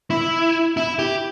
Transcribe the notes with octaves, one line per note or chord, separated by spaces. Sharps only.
E4
E4
G4